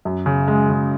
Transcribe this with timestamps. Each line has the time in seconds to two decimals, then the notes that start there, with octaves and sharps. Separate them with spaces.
0.05 F#2
0.26 C#3
0.48 G#3
0.70 C#3